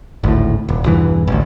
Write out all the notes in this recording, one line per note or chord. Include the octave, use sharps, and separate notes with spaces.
G#1 D2 A2
D#1
B1 E2 G2 E3
A1 D2